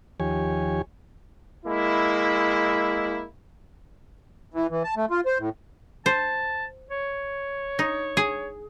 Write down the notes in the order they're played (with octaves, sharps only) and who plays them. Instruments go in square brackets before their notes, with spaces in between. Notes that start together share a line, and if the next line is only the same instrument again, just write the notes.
[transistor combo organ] D#2 F3 G4 C#5 G#5
[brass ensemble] G#3 A#3 E4
[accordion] E3
E3
A5
A3
F4
C5
A2
[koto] C5 [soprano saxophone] A5
[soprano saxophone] C#5
[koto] D#4
G#4